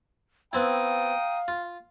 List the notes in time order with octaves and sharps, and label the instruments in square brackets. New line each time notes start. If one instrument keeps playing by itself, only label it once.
[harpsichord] B3 C4 E4 [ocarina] F5 [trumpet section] G5 A#5 D#6
[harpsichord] F4